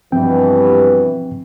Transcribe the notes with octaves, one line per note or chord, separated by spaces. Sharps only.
G2 B2 E3 F3 C4 G5